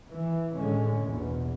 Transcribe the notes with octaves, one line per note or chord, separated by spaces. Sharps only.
E3
A2 D3 G#3 C#4
A#1 E2 B2